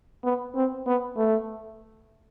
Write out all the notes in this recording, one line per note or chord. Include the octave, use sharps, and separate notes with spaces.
B3
C4
B3
A3